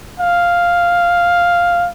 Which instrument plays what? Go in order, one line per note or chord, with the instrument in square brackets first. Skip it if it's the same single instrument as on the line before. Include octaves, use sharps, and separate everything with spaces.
[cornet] F5